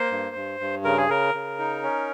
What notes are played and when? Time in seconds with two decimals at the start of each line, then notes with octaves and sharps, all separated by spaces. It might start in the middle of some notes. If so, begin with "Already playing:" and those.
Already playing: A#3 C5
0.11 G2
0.36 G2
0.60 G2
0.85 C#3 A#4
0.97 G#4
1.09 C#3 A#4
1.34 C#3
1.59 D#4
1.83 C#4